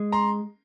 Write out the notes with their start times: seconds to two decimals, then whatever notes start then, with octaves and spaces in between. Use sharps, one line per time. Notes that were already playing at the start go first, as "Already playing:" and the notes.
Already playing: G#3
0.12 A#5 C6